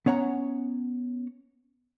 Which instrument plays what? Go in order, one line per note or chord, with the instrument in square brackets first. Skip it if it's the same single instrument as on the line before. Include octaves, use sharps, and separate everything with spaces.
[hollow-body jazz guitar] B3 C#4 C#5 F#5 A#5